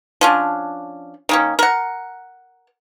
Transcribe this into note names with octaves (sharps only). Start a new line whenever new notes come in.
F3 C#4 D4
D#3 A#3 C#4
A#4 F#5